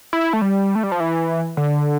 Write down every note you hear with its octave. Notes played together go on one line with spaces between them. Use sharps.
E4
A3
G3
A3
G3
F3
E3
D3